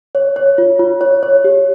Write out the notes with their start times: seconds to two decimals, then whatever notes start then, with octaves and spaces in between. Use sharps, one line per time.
0.15 C#5
0.36 C#5
0.58 F4
0.79 F4
1.01 C#5
1.23 C#5
1.44 G4